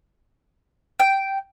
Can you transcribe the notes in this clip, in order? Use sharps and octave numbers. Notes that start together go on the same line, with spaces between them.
G5